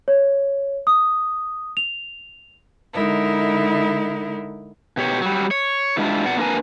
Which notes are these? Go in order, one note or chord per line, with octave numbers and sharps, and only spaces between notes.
C#5
D#6
F7
D3 G#3 D#4 E4 A#4
B2 G4 C#5
F#3 G3
C#5
E3 G3 G#3 D4 E4 F4
B2 D5 F#5
A#3 D4 F4 A#4 B4 G#5